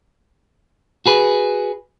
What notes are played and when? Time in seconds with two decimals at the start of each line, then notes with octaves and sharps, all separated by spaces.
1.06 F#4 G#4 B4